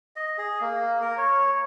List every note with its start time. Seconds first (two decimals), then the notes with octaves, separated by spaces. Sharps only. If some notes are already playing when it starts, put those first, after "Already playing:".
0.16 D#5
0.38 G#4
0.61 A#3
1.02 A#4
1.17 C#5